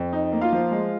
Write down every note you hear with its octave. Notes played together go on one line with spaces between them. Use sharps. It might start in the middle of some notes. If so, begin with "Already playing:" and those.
Already playing: F2
D#4
A#3
F4 F5
F3
G#3